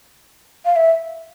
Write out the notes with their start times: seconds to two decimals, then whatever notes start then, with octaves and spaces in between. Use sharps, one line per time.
0.66 F5
0.76 E5